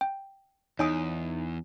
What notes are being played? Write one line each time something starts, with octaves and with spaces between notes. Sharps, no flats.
G5
E2 D#4 C#5 G#5 D#6